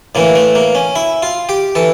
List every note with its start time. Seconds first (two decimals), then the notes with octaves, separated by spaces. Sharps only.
0.15 A2 E3 A#3
0.36 A3
0.55 A#3
0.75 C#4
0.96 E4
1.23 F4
1.49 G4
1.75 E3 A4